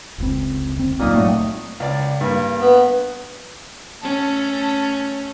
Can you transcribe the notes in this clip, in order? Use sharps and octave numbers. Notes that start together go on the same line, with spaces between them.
F1 C#2 C4
D2 C4
C#2 A#2 F#3 D#4 D#6
G2 F#3 A3 C4
C#2 D5
G2 A#3
B3
A3 C#4 A5